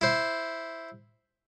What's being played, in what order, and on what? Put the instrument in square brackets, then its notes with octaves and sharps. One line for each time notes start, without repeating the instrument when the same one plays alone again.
[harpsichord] E4 C5